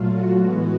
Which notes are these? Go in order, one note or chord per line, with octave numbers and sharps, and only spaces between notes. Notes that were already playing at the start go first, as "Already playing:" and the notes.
Already playing: A#2 F#3 A3 F4
F#4
A2 E3 G#3 B3